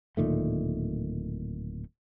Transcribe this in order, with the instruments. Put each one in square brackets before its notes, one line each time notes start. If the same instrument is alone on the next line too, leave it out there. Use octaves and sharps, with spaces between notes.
[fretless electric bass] D1 A#2 D#3 A3